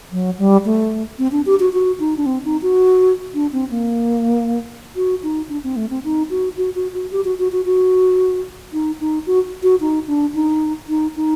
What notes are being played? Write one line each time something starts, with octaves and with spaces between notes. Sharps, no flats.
F#3
G3
A3
C4
D4
G4
F#4
F#4
D#4
D4
C4
D#4
F#4
D4
C4
A#3
F#4
D#4
D4
C4
A3
C4
D#4
F#4
F#4
F#4
F#4
G4
F#4
F#4
F#4
F#4
D#4
D#4
F#4
F#4
D#4
D4
D#4
D#4
D#4